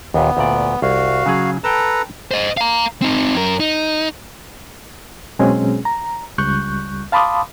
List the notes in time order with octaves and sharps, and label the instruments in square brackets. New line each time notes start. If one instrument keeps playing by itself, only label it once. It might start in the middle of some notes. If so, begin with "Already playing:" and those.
[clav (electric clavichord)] D#2 A#2 [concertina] B3
[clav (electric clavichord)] D2 A#2 D5
[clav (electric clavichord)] C2 [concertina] F#4 F5
[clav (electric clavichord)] C#3 F#3 G#4
[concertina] A4 B4 A#5 [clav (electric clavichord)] G5 A5
[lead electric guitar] C5 D#5
F5 A#5
C4 D#4
F#2 A#4
D#4
[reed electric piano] B2 F#3 G#3 C4 C#4 G#4
A#5
C#2 G3 C#6 F#6 G6
F5 A5 B5 C6 D6 D#6